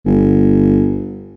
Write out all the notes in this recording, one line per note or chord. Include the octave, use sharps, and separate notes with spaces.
G1